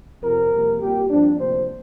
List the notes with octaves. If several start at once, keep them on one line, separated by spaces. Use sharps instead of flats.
F2 C3 F3 C4 A#4
F2 C3 G3 A#3
A#2 G3 A#3 G4
G2 F3 C4 D4
D2 C3 F3 A#3 C5